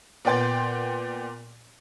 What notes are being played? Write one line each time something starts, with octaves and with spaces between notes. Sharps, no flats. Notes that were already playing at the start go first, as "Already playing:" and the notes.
A#2 B3 D5 G5 C6 A6